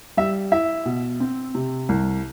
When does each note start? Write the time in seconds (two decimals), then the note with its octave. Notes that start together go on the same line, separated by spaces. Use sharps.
0.17 G3 E5
0.52 E4 E5
0.86 B2
1.20 C4
1.55 C3
1.89 C2